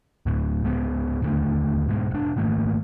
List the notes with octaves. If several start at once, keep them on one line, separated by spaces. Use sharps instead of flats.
D2 A2
C#2 G#3 B3
D1 D#2 D3 A3
G#2 B2 F#3 G#3
F1 D4
G#2 D#3 A3 A#3